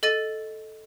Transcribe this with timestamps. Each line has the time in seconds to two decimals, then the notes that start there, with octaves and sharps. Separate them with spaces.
0.03 A4 D#5 A6 D#7